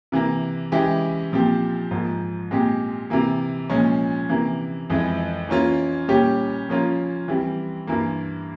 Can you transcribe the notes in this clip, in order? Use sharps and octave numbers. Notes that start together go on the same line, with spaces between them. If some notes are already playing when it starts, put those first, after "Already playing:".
C3 E3 A#3
C#3 E3 G#3 E4 G4
A#2 F3 C4 G4
G#2 F3 A#3
A#2 G#3 C4 G4
C3 E3 A#3
A#2 F3 G#3 C#4
C3 E3 A#3
F2 E3 G#3 E4
E3 A#3 C#4 F4
A#2 G3 C#4 G4
C#3 F3 A#3 C#4 F4
E3 G3 C4
G2 E3 A#3